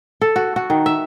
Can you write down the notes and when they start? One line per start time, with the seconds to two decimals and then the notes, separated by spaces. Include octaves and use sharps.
0.21 A4
0.36 F#4
0.56 F#4
0.70 D#3
0.86 E5